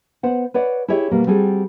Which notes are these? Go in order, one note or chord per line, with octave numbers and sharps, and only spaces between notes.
B3 C5 F#5
B4 C#5 D5 F#5
E4 G4 G#4 C#5 E5
B2 G3 A#3
G3 C4 F#4 G#4 A4